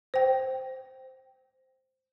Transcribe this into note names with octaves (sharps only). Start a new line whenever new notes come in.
C5 G5